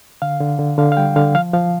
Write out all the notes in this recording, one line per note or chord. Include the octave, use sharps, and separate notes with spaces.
D3 F5
D3
D3
D3 F5
F5
G3 G5
D3 F5
F3 F5
F3 F5